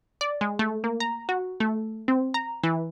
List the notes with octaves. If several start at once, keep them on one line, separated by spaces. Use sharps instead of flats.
D5
G#3
A3
A#3
A#5
F#4
A3
C4
A#5
E3